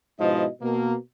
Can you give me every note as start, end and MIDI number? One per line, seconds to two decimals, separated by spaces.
0.20 0.46 44
0.20 0.46 47
0.20 0.46 53
0.20 0.46 64
0.20 0.46 75
0.62 0.95 47
0.62 0.95 58